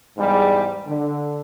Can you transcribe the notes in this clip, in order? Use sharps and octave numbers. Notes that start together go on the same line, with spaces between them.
E2 G#2 G3
D3